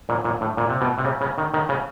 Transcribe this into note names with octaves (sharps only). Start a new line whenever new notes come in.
A#2
A#2
A2
A#2
C3
B2
C3
C#3
C#3
D#3
D#3
C#3